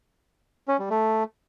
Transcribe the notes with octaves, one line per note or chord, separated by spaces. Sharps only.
C#4
G3
A3